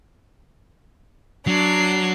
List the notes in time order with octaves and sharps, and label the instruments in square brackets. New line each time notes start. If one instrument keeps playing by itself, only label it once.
[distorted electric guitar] F#3 [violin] D4 C7